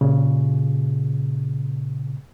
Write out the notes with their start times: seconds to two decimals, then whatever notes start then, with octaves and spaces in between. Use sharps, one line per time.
0.01 A#2 C#3